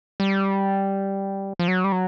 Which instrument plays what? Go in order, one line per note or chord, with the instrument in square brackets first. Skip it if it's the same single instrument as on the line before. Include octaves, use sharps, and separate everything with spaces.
[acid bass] G3
F3
F#3
G3
F#3